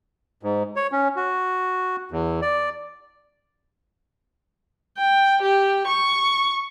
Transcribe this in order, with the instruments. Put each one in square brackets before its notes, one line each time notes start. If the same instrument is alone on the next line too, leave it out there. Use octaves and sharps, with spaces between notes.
[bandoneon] G#2
C#5
C#4
F#4
E2
D5
[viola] G5
G4
C#6